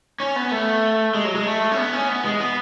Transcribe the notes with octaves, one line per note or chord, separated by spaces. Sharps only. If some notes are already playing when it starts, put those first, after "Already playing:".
C#4
B3
A3
G#3
F#3
G#3
A3
C#4
B3
C#4
B3
G#3
B3